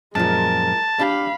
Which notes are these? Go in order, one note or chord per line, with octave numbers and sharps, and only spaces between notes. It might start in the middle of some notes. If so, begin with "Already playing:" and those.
F#2 A#2 F3 G#3 A#4 A5
D4 G4 F5 B5